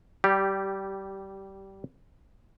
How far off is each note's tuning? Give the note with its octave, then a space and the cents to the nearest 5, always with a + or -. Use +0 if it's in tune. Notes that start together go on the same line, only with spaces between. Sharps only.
G3 -20 G4 +0